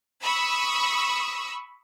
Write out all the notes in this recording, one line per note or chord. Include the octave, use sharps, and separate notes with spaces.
B5 C#6 D#6 E6